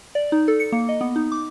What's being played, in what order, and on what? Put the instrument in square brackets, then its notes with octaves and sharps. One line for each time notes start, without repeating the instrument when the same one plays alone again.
[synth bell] D5
D#4
A4
C#7
A#3
D#5
B3
D#4
D6